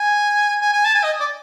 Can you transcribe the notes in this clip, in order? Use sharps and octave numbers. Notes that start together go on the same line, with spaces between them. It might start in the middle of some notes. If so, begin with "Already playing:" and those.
Already playing: G#5
G#5
G#5
A5
G#5
D#5
D5